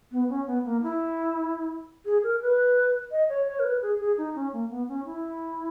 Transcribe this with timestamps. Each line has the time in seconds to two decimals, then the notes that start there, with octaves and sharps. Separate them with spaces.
0.12 B3
0.29 C#4
0.47 B3
0.65 A#3
0.83 E4
2.05 G#4
2.23 A#4
2.42 B4
3.11 D#5
3.29 C#5
3.47 C#5
3.60 A#4
3.65 B4
3.82 G#4
4.00 G#4
4.18 D#4
4.35 C#4
4.53 A#3
4.71 B3
4.88 C#4
5.06 E4